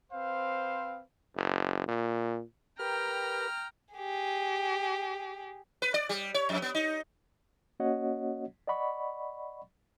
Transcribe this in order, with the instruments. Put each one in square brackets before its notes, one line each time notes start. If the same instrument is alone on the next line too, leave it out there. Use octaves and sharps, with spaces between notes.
[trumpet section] C4 B4 C5 F5
[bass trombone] F#1
A#2
[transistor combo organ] G4 A#4 B4 [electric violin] G5 A#5 [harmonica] F6
[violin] G4 G#4
[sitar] B4
D5
G3
C#5
F2
B3
D#4
[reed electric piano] A#3 C#4 F#4 C#5 D#5 F#5
D5 D#5 F#5 B5 C#6